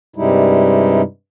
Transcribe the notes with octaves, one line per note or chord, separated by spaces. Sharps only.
G2 C3 G3 G#3 D#4 E4